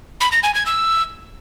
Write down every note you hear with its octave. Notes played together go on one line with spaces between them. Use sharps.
B5
A#6
G#5
G#6
E6